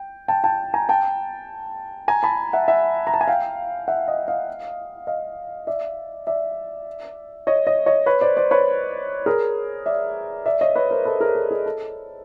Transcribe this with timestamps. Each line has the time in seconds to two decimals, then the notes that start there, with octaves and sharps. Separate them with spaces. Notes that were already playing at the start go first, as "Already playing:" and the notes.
Already playing: G5
0.28 G5 A5
0.44 G5 A5
0.74 G#5 A#5
0.89 G5 A5
2.08 G#5 A#5
2.23 A5 B5
2.53 E5 F#5
2.68 E5 F#5
3.07 A#5
3.14 A5
3.21 G#5
3.28 F5 G5
3.88 E5 F#5
4.08 D#5 F5
4.28 D#5 F5
5.07 D#5 F5
5.67 D5 E5
6.27 D5 E5
7.47 C#5 D#5
7.67 C#5 D#5
7.86 C#5 D#5
8.06 B4 C#5
8.21 C5 D5
8.37 C5 D5
8.51 B4 C#5
9.26 G#4 A#4
9.86 D5 E5
10.46 D5 E5
10.61 C#5 D#5
10.76 B4 C#5
10.91 A#4 C5
11.05 A4 B4
11.20 G#4 A#4
11.35 A4
11.51 G#4
11.66 A4